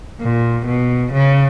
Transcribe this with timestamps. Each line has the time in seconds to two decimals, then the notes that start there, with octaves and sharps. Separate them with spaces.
0.21 A#2
0.67 B2
1.13 C#3